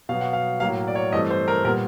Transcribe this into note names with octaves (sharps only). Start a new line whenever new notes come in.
B2 F#3 B3 F5
F#5
F5
A2 F#3 A#3 F5
D5
C#5
G2 E3 A3 C4 D#5
C5
A#4
A#2 G3 B3 A#4